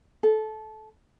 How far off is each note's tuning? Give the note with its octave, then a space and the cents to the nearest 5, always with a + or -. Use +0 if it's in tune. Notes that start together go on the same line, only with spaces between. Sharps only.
A4 -20